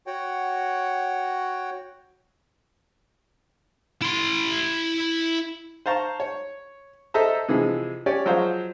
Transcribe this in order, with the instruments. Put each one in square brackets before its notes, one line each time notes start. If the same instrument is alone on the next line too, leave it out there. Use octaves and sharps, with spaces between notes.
[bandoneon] F#4 C#5 F#5 G5
[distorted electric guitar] E4 C6
[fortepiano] C5 F5 A5 A#5 C#6
C#5
A4 C5 D#5 E5 A#5
C3 E3 F3 G#3
C#4 G4 C#5 D5
F3 F#3 G#3 C5 F5